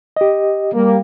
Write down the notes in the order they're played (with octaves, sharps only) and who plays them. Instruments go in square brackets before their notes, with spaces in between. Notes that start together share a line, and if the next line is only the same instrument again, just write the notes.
[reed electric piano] G4 D#5
[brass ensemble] G3 A#3